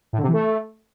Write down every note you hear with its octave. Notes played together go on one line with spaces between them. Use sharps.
A2
D3
C3
E3
A3